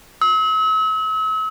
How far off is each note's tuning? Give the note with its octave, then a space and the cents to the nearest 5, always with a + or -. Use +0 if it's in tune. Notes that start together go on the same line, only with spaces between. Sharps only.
E6 -40